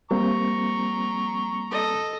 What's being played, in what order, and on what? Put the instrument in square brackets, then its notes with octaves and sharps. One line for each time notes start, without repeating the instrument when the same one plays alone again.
[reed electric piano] G3 A#3 C4 [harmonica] A#5 C#6
[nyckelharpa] A4 D#5